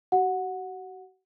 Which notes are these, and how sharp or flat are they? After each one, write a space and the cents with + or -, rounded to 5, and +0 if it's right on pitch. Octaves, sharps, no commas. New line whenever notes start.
F#4 +40 F#5 -10